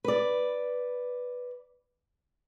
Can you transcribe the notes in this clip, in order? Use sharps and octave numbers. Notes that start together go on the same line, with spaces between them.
B4 D5